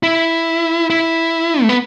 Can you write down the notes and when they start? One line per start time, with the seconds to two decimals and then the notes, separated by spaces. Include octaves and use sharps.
0.03 E4
0.90 E4
1.62 A3
1.69 B3